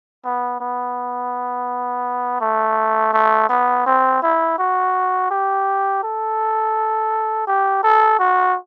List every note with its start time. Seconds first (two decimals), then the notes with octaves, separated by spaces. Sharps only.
0.25 B3
0.61 B3
2.41 A3
3.14 A3
3.49 B3
3.86 C4
4.23 E4
4.58 F#4
5.31 G4
6.03 A4
7.47 G4
7.83 A4
8.19 F#4